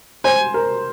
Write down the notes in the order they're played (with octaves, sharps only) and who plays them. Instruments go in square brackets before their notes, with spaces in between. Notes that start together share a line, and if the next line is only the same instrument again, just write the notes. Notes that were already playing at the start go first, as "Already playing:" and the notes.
[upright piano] C5 [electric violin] G#5
[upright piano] A#4